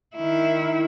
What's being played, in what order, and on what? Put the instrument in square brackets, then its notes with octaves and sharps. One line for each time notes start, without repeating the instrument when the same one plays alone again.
[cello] D#3 E4